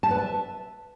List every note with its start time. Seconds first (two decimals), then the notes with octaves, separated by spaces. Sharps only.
0.03 A5
0.11 B4
0.18 E5